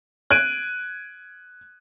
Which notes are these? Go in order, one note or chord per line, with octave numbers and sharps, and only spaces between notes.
F#6 G#6 D7 D#7